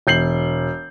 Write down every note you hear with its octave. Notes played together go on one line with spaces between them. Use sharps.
E1 G6 C7 F#7